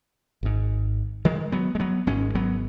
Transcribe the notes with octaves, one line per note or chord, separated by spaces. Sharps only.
G#1 G#2
D#3 G#3
F#3 B3
G#3
F#3 B3
G#1 G#2 G#3 C#4
F#3 B3